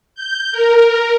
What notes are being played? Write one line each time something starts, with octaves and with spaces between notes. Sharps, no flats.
G6
A#4